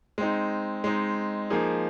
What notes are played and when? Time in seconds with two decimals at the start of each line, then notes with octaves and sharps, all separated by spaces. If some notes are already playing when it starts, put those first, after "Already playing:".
0.18 G#3 C4 D#4
0.84 G#3 C4 D#4
1.50 F3 A#3 D#4 G#4